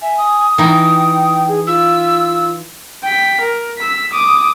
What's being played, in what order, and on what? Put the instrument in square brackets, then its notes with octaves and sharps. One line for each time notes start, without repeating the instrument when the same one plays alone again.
[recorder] E5 [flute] G#5
[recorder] D#6
[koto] E3 D#4 [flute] G5
[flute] G#4
[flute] F4 [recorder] E6
[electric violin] G5 B6
A#4
E6 B6
D6 D#6